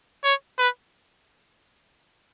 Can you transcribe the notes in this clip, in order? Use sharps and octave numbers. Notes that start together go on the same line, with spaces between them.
C#5
B4